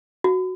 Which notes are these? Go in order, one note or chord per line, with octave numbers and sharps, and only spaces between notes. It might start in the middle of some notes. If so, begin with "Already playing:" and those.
F#4